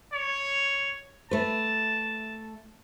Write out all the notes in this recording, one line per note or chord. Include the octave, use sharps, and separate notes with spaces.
C#5
A3 B4 A5